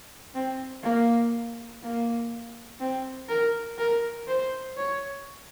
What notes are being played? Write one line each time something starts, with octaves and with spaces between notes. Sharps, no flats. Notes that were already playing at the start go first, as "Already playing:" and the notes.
C4
A#3
A#3
C4
A#4
A#4
C5
C#5